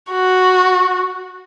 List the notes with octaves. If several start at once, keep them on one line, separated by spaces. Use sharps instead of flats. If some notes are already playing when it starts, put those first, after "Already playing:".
F#4